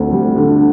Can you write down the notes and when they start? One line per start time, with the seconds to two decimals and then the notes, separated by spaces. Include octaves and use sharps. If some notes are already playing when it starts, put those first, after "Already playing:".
Already playing: D2 D3 C4
0.12 G3
0.36 D3